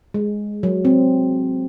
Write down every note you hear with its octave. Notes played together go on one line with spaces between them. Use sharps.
G#3
F#3
C4